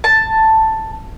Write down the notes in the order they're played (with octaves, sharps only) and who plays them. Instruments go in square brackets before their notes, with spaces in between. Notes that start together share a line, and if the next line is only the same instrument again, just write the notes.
[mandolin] A5